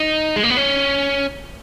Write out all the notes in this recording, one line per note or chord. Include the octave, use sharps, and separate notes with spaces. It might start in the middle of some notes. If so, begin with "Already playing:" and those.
Already playing: D#4
G#3
A#3
B3
C#4